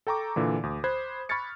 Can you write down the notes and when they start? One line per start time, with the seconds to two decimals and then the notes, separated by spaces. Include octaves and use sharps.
0.07 A4 G5 A#5 C#6 D6
0.36 A#2 D3 E3
0.63 D2 D#6
0.84 C5 B5 F#6 G#6
1.29 B5 C#6 F6 G#6 A6 C#7